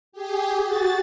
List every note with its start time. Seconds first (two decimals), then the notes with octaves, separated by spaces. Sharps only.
0.12 G4 G#4
0.60 F#4 A6